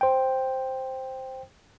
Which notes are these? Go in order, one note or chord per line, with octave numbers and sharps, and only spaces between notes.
C5 G5